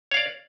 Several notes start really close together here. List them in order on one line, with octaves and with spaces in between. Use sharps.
C#5 F5 D5